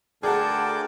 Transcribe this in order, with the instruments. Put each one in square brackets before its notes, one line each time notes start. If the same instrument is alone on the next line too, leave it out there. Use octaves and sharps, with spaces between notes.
[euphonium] D2 [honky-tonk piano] G#4 F#5 [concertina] A#4 D5 G5 [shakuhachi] A5